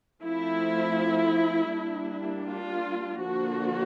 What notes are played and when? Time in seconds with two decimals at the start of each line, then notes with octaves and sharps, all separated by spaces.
0.23 F3 A3 C4 E4
1.72 G3 A#3 D4
2.48 F4
3.23 D3 F3 A#3 D4 F#4